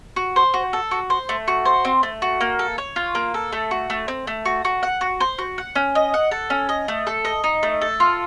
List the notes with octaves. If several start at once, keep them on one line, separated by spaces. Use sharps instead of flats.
F#4
C5
F#4
A4
F#4
C5
A3
F#4
C5
C4
A3
F#4
A#3
A4
C#5
F4
A#3
A4
A3
F#4
A3
C4
A3
F#4
F#4
F#5
F#4
C5
F#4
F#5
C#4
D#5
F#5
A4
C#4
D#5
A3
A4
D#5
D#4
A3
A4
F4